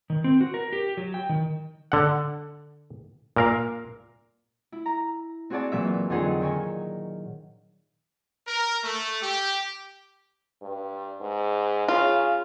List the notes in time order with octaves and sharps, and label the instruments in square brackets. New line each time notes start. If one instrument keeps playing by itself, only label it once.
[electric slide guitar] D#3
C4
F#4
A#4
G4
F#3
G5
D#3
[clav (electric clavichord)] D3 F#5
A#2 A#4 F5
[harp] E4
A#5
C4 F#4 G#4 C#5 D5 A5
A#2 E3 F#3 E5
F2 D3 F#3 D#4 G#4
D#3 C#5 G#5
[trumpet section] A#4
A3
G4
[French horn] G2
G#2
[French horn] C#3 [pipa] F4